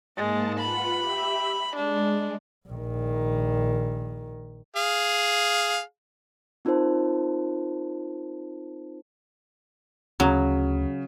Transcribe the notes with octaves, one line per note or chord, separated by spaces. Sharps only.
G#2 G#3 A#3 A5
F4 B4 F#5 B5
G4 E5
G#3 D4
A#1 D#3
G#4 F5
C4 D#4 F4 A#4 C5 A5
D2 C#3 F#3